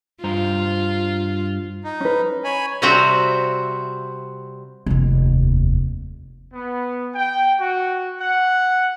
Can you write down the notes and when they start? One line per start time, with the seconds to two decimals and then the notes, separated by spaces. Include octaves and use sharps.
0.24 G2 F4 C5 A#5
1.84 D#4
2.00 C#4 B4
2.44 C#5 G#5 B5
2.82 C3 G3 C4 F#4 E5 A#5
4.86 F1 D#2
6.53 B3
7.15 G5
7.60 F#4
8.18 F#5